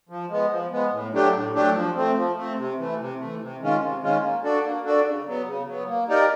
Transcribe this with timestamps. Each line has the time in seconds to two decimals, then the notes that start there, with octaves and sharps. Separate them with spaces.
0.09 F3
0.30 G#3 B3
0.50 F3
0.71 G#3 B3
0.91 A2
1.12 F#3 A3 D4 G4
1.32 A2
1.54 F#3 A3 D4 G4
1.74 F3
1.95 A3 C4
2.15 F3
2.36 A3 C4
2.57 C3
2.78 E3 A3
2.98 C3
3.19 E3 A3
3.40 C3
3.60 D#3 G#3 C#4 F4
3.81 C3
4.01 D#3 G#3 C#4 F4
4.22 A#3
4.43 D4 F#4 A4 D5
4.63 A#3
4.84 D4 F#4 A4 D5
5.05 C#3
5.26 F#3 B3
5.46 C#3
5.67 F#3 B3
5.87 A#3
6.08 D#4 G4 A#4 D5